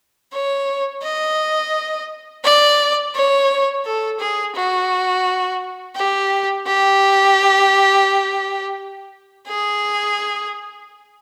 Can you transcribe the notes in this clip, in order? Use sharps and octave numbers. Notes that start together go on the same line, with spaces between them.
C#5
D#5
D5
C#5
A4
G#4
F#4
G4
G4
G#4